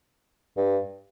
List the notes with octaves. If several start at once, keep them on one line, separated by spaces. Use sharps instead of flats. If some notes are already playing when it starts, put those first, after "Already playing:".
G2